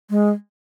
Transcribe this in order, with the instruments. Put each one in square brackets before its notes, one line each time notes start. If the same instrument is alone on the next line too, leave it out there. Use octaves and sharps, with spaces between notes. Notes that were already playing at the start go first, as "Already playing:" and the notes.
[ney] G#3